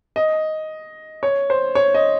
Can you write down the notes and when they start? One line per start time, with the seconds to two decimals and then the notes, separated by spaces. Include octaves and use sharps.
0.16 D#5
1.23 C#5
1.50 C5
1.75 C#5
1.94 D#5